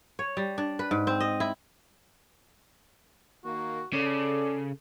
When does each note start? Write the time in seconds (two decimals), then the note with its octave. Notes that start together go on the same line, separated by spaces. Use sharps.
0.19 C#5
0.37 G3
0.58 D4
0.79 B4
0.91 G#2
1.07 C4
1.20 D#5
1.40 E4
3.45 D#3 A#3 F#4
3.93 C#3 A4 D5